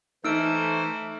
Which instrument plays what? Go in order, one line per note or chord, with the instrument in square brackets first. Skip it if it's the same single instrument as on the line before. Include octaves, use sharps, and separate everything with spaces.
[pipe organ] E3 C5 [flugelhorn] A3 [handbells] D#4 [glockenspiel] E6 F6 D7